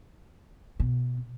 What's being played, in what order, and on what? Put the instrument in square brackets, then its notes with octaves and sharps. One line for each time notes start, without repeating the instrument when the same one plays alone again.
[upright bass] B2